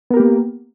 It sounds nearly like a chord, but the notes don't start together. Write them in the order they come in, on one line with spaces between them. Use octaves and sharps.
B3 A#4 G4 A#3